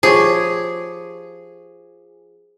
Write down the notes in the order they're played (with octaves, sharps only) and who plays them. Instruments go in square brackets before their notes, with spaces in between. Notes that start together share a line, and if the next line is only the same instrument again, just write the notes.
[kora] F3 G4 C#5 [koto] G#4